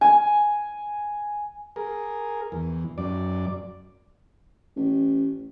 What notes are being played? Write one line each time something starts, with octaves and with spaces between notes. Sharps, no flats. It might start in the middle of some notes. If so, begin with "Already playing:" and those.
G#5
G#4 A#4
E2
F#2 D5
A1